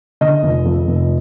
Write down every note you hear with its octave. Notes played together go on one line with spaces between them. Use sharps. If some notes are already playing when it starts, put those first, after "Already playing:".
D3 D#5
F1
F2
F1